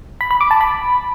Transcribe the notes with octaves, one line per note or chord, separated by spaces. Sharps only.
B5
B5
D6
A5
B5